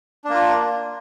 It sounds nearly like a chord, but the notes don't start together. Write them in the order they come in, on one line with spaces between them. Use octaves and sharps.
D4 A#3 F4